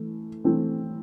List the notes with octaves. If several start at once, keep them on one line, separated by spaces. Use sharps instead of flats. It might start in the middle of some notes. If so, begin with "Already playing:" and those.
Already playing: E3 A3
E3 A3 C4